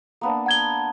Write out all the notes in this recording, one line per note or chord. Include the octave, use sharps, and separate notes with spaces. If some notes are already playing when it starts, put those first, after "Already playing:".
A#3 B3 D4
F#5 G#6 G7